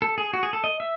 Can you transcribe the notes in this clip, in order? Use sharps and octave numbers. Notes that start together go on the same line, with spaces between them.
A4
G#4
F#4
G#4
A4
D#5
E5